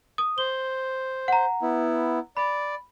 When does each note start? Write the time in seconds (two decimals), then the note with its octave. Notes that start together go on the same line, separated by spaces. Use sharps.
0.18 D#6
0.38 C5 G7
1.28 F#5 A#5
1.62 B3 E4
2.37 D5 B5